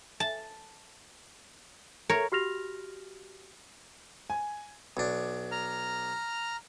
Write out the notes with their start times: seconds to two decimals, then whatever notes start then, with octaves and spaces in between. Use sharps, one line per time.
0.20 A5
2.09 A#4 C#5
2.32 F#4 G4 F6 A#6 F7
4.30 G#5
4.97 B1 D4
5.52 A#5 F6